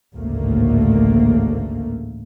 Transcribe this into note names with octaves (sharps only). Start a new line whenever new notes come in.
A1 D2 G#2 C#3 A3 A#3